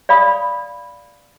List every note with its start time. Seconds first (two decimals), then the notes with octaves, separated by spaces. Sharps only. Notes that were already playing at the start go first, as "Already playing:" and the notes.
0.09 D5 F5 B5 D#6